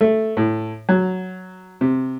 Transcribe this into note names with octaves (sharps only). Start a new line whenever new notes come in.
A3
A2
F#3
C3